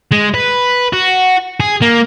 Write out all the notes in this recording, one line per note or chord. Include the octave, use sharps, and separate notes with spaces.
G#3
B4
F#4
G#4
A#3